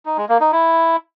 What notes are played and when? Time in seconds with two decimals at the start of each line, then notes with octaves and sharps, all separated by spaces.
0.06 D#4
0.17 G#3
0.29 A#3
0.41 D#4
0.52 E4